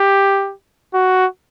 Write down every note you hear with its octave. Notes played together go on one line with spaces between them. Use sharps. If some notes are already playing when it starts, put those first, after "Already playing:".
Already playing: G4
F#4